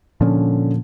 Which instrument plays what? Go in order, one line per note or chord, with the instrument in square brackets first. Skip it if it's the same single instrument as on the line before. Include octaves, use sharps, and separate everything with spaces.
[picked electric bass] A#2 F3 [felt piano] D3 C#4